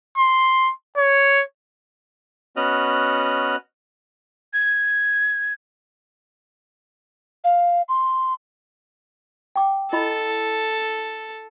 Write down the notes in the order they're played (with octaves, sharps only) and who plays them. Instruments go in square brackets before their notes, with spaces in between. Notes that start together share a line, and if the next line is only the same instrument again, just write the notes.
[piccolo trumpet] C6
C#5
[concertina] B3 C#4 F#4 D#5 F6 F#6
[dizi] G#6
[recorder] F5
C6
[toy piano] G5 D6
[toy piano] E4 D#5 B5 [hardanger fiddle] A4